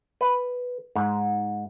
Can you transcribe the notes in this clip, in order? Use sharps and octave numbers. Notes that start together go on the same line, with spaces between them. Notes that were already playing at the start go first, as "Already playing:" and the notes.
B4
G#2